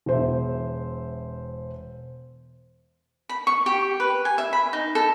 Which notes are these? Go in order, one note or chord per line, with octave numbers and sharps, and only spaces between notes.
E1 C5 E5
B5
C#6
G4
B4
G#5
E5
B5
D#4
A4